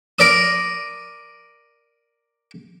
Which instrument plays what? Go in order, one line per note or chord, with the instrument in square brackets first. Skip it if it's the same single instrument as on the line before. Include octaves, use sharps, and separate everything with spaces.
[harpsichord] A#4 D5 D#6